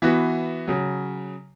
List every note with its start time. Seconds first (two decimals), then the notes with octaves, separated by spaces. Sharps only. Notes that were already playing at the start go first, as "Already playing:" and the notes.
0.02 E3 B3 F#4
0.68 C#3 F#3